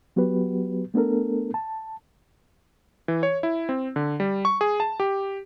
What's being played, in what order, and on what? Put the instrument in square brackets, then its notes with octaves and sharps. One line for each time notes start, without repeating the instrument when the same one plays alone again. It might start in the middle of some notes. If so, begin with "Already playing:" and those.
[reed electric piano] F#3 B3 F#4 G4 B4
A3 B3 D4 A4 A#4
A5
[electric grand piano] E3
C#5
E4
C4
D3
G3
C#6
G#4
A5
G4